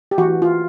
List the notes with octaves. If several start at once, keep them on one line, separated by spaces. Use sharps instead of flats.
G4
E3 F#4
F4